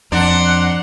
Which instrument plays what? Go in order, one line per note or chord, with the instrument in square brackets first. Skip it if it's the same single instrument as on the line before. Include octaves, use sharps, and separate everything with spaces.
[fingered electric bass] F2 [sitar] D4 [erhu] F#5 [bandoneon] A#5 C6